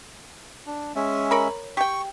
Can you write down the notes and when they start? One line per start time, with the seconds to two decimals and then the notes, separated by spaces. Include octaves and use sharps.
0.67 D4
0.96 G#3 C#4 E5
1.31 A#4 C#5 B5
1.77 G4 G5 C#6